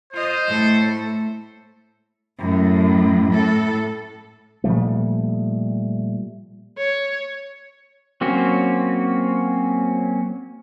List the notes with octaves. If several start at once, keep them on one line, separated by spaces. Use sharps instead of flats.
F4 C5 D#5
A2 A3 A4
F#2 A2
A2 A4
A#2 F3 G3 A3
C#5
F#3 A#3 C4 C#4 F#4